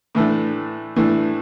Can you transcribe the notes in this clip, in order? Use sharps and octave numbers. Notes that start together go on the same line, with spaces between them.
A2 E3 A3 D4
A2 E3 A3 D4